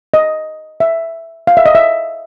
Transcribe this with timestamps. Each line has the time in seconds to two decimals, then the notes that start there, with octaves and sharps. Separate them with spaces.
0.14 D#5
0.80 E5
1.47 F5
1.57 E5
1.66 D#5
1.75 E5